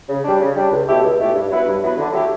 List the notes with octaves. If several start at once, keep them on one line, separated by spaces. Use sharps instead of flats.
C#3
G3 D4
C#3
G3 D4
C#2
B2 A3 E4 G4
C#2
B2 A3 E4 G4
G2
F#3 B3 E4 B4
G2
F#3 B3 E4 B4
D3
F#3 A3 E4 G4